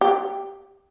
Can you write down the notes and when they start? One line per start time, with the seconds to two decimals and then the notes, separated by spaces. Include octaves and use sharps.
0.01 G4